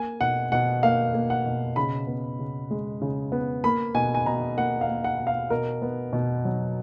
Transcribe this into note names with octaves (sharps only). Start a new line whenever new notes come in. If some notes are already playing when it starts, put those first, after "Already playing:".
Already playing: A#3 G#5
B2 F#5
B2 F#5
A#3 F5
A#3
F#5
B2
C#3 B5
B3
C#3
G#3
C#3
B3
A#3 B5
B2 G#5
G#5
B2 A#5
A#3 F#5
F5
A#3
F#5
B2
F5
B2 A#4
B3
B2
F#3